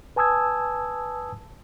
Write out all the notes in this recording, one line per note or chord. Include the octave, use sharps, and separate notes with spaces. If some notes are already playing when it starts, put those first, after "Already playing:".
B4 G#5 A5 D#6 E6 G#6